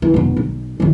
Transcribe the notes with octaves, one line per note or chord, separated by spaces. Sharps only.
E3
F1 B2
B1
A1 D#3